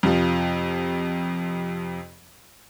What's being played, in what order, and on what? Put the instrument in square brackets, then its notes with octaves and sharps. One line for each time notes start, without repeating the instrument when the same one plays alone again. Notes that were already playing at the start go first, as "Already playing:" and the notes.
[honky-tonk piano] F2 C3 F3